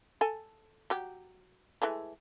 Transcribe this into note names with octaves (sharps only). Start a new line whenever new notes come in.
A4 G#5
F#3 G4
E3 G#3 A3